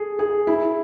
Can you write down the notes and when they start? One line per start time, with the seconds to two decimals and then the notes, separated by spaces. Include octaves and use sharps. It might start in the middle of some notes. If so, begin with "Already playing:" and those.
Already playing: G#4 A4
0.19 G#4
0.47 E4